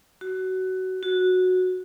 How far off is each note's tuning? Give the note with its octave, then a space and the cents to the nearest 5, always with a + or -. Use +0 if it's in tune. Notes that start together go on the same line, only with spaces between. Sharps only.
F#4 +20
F#4 -10